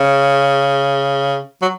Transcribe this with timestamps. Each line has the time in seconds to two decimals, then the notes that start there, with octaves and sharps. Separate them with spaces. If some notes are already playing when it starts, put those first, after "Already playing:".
Already playing: C#3
1.62 F#3